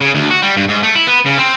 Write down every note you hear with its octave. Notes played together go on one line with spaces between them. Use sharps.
C#3
D2
F#4
G3
G2
G#2
A3
E4
B3
C#3
C4